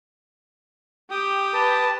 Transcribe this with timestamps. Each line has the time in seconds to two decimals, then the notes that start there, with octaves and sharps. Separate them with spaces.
1.11 G4 G5 D#6
1.54 B4 A5